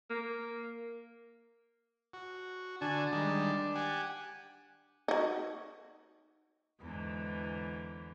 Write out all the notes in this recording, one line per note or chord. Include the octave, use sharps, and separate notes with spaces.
A#3
F#4
D3 D4 F#4 G#5
D#3 G3 G#3
G4 F#5 G#5
D#4 F#4
E2 G#2 D3 E3